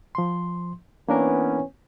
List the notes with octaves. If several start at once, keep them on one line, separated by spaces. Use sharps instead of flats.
F3 C6
E3 A#3 B3 C#4 D4 A#4